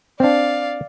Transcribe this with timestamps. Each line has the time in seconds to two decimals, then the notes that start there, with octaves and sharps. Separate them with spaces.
0.20 C4 D4 D5 F5